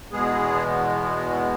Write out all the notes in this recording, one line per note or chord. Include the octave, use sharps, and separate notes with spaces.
E2 B2 G#3 B3 G#4